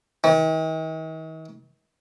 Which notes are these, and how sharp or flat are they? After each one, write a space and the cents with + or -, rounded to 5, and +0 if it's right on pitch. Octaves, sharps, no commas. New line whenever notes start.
D#3 +45